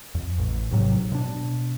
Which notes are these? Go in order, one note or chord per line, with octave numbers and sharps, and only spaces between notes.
F2
A1
A1 G#2 C3 F#3
B2 D4